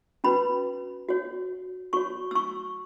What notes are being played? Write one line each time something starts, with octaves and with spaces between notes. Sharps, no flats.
C#4 F#4 B4 B5
F#4 C#5
F#4 C#5 C#6
E6
C#6